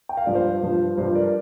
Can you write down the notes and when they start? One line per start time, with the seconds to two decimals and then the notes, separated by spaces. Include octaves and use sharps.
0.09 G5
0.17 F5
0.26 G2 F3 D5
0.35 C5 F5
0.62 G2 F3
0.98 G2 F3 C5
1.15 A#4 D5